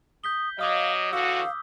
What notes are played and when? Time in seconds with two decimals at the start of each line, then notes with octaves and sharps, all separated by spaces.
0.24 D#6 G6 B6 G7
0.59 F#3 D#5 F5 D6 D#6 F6
1.13 D3 E3 F#4 F5 E6